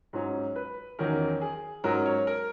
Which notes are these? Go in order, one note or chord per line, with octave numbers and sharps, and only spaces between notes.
G#2 F#3 C#4
B4
E2 D#3 F#3 C#4 A#4
G#4
G#2 F#3 C#4 A#4
C#5
A#4